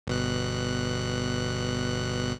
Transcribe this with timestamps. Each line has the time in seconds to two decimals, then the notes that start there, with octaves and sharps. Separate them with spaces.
0.07 G1 B2 F#6